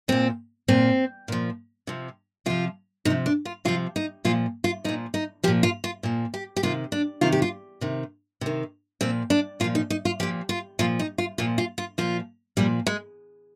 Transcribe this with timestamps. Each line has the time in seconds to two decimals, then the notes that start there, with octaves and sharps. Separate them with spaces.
0.08 A#2 F3 C4
0.68 A#2 F3 C4
1.28 A#2 F3
1.87 C3 F3
2.46 C3 F3 F4
3.05 C3 F3 D#4
3.26 D4
3.45 F4
3.65 C3 F3 F4
3.96 D#4
4.25 A#2 F3 F4
4.64 F4
4.84 F3 D#4
4.89 A#2
5.14 D#4
5.43 F3 G4
5.48 A#2
5.63 F4
5.84 F4
6.03 A#2 F3
6.34 G4
6.56 G4
6.63 C3 D#3 F4
6.92 D4
7.21 C3 D#3 F4
7.32 G4
7.42 F4
7.81 C3 D#3
8.41 C3 D#3
9.01 A#2 F3 C4
9.30 D4
9.60 A#2 F4
9.64 F3
9.75 D#4
9.90 D#4
10.05 F4
10.20 A#2 F3 G4
10.49 F4
10.79 A#2 F3 F4
10.99 D#4
11.18 F4
11.38 A#2 F3 F4
11.58 F4
11.78 F4
11.98 A#2 F3 F4
12.57 A#2 F3 G3
12.87 G#3